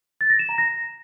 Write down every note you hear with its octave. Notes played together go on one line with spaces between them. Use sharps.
A6
A#6
E7
A#5
A#6